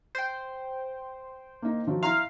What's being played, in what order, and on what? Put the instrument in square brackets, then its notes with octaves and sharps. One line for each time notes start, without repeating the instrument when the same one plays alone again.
[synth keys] C5 G5
[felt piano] A#3 D#4
D#3 F3 F#3
[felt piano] E4 A#5 C6 [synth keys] F5